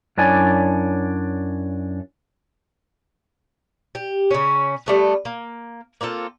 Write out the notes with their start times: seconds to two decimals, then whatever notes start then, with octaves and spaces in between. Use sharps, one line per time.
0.18 F#2 D4 E4 C#5 D5 G#5
3.95 G4
4.31 C#3 C#4
4.86 G3 A3 B3
5.25 A#3
6.01 A#3 C4 F4 A4